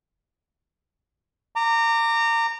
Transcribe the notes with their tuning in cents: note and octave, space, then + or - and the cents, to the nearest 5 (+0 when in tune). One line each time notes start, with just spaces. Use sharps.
A#5 -25 D6 +5